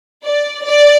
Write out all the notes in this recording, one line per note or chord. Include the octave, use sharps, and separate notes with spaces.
D5
D5